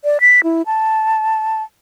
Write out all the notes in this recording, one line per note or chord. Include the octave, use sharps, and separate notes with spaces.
D5
B6
E4
A5